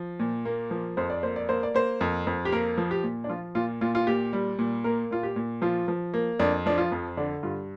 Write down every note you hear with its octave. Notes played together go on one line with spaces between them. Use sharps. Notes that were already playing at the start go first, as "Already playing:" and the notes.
Already playing: F3
A#2
A#3
F3
F2 C5
D5
A#3 C5
D5
A#3 C5
D5
A#3 C5
F2
F2
G4
A#3 A#4
F3
G4
A#2
D4
F3 F4
A#2 F4
A#2 F4
F4
A#2 G4
G3
A#2
A#3 A#4
A#2 F4
G4
A#2
F3 F4
F3
A#3
F2 D4
F3 D4
F4
F2
D3 D4
G2 F4